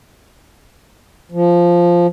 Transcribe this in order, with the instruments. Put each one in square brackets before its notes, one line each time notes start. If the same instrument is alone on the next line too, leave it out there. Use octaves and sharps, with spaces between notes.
[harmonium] F3